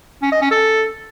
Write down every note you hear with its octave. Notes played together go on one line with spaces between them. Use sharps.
C#4
D#5
C#4
A4